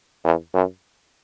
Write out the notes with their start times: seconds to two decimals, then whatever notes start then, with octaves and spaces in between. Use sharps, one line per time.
0.24 E2
0.54 F#2